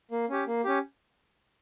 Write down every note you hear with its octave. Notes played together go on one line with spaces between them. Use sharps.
A#3
C#4 G4
A#3
C#4 G4